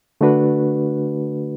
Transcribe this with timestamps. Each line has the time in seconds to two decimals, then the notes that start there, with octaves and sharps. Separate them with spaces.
0.21 D3 A3 D4 F#4 B4